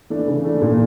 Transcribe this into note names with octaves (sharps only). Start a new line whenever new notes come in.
E3 A3 D4
C#3
E3 A3 D4
A#2